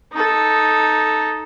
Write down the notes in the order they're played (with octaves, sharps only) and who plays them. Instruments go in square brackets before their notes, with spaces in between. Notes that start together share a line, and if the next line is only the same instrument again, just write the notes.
[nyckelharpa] D#4 A4